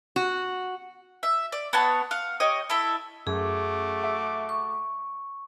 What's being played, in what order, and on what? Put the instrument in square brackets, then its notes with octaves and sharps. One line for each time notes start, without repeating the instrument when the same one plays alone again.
[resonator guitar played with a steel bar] F#4
[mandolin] E5
D5
B3 C#5 F#5 A5
F5 F#5
G4 C#5 D#5
E4 A4 E5
[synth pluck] F#2 [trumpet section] A3 F#4 D6 [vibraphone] G#4
[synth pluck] E5
[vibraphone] C#6